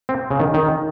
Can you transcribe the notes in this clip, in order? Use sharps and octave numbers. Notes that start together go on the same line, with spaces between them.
C4
C#3
D#3
D#3